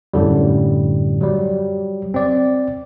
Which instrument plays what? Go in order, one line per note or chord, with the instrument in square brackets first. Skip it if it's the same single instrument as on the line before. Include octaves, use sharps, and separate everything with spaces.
[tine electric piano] F#2 A2 D3 G3
F#3 G3
C4 D5